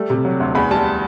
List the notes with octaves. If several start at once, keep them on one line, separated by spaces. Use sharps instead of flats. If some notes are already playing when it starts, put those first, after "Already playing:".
Already playing: G3 A3
C3
F#3
D2
E2 B5
G3 A5